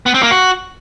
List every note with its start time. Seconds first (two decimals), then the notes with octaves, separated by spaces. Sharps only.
0.06 B3
0.14 C4
0.23 A#3
0.31 F#4